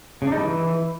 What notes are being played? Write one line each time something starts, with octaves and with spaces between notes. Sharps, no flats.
C#3
D4
D#4
G3
E3